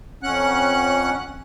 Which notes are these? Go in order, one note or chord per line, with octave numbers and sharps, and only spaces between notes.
F2 C#4 F#5 F#6